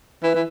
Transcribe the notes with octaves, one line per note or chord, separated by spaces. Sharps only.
E3 B4
E3